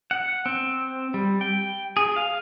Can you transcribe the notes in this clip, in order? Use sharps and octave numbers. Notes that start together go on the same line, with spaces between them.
F#5
C4
G3
G5
G#4
F5